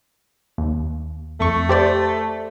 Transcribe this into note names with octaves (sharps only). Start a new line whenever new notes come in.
D#2
F2 A3 C#6
G4 C5 D5